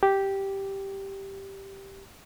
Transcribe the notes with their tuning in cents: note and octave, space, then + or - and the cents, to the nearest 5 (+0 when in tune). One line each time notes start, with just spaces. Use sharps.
G4 -5